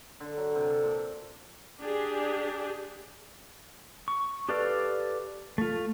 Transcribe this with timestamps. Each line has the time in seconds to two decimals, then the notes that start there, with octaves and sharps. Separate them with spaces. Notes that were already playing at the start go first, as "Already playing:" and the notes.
0.20 D3
0.37 F#3
0.55 C3
0.70 A4
0.84 A#2
1.80 D4 G4 G#4
4.08 C#6
4.49 G4 A4 B4 D5 F5
5.58 A3 F4